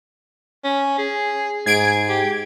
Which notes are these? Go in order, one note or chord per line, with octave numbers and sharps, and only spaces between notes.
C#4
G#4
G#2 G#4 G#6 D7
G4